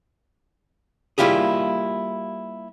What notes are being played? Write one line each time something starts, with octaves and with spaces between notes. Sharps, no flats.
G3 A#3 E4 F4 G4 G#4